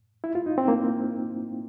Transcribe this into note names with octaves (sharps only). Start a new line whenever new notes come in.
E4
F4
D#4
C4
A#3